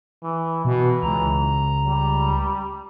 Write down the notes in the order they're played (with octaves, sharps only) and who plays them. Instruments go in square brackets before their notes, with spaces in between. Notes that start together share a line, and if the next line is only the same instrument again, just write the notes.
[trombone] E3
[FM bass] B2 [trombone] E3
[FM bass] C#2 [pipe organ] A#5
[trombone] G3